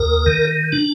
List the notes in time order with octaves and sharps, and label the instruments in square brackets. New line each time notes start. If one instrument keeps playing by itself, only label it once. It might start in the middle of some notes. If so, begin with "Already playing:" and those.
Already playing: [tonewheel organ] D#2 A#4
D#3
D4